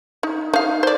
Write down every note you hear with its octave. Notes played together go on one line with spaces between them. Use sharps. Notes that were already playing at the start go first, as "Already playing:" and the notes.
D#4
D#4 F5
C5 D5